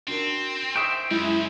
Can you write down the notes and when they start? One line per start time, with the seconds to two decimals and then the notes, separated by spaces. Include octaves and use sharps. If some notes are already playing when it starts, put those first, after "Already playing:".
0.08 C4 D4 F#4 A#4
0.76 C5 E5 G5 C#6 D#6 G6
1.11 C#2 F#2 G#3 E4